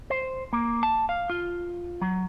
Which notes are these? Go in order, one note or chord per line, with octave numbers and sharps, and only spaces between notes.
C5
A#3
A5
F5
F4
F#3